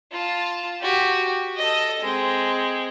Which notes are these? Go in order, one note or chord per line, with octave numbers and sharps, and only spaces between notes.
F4 A5
F#4 G4
A4 D#5
G#3 C4